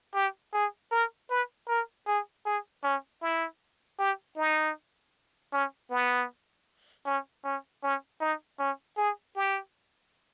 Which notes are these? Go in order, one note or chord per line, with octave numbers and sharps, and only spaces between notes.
G4
G#4
A#4
B4
A#4
G#4
G#4
C#4
E4
G4
D#4
C#4
B3
C#4
C#4
C#4
D#4
C#4
G#4
G4